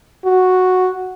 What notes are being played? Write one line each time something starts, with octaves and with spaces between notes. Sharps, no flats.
F#4